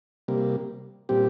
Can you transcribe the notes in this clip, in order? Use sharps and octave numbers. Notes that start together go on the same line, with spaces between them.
C3 G3 A#3
A#2 G3 C4 G4